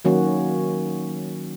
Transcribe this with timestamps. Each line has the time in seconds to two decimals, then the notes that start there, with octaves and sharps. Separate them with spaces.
0.05 D#3 F#3 A#3 C#4 F#4